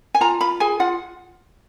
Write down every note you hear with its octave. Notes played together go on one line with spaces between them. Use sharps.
G#5
F4 A#5
F4 B5
G#4 G#5
F4 F#5